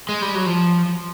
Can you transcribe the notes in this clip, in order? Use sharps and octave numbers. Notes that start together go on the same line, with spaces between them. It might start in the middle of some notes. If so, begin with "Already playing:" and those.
G#3
G3
F#3
F3